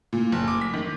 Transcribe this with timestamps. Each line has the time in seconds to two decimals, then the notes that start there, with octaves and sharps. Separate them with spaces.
0.13 A#2
0.32 F#1
0.48 D6
0.61 B6
0.74 D#3